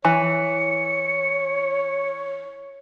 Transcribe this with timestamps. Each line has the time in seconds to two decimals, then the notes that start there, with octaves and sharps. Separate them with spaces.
0.05 E3 C#5 C#7